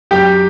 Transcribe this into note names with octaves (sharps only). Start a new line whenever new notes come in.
F#2 G4 G5